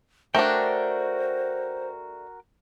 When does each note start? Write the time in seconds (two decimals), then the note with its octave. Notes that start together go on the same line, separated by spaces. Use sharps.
0.35 A3 D4 F#4 A#4 C5 G5